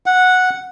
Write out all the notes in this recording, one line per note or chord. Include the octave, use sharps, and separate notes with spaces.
F#5